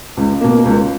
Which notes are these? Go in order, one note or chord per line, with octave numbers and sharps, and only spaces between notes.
C#2
B2 A#3
C#2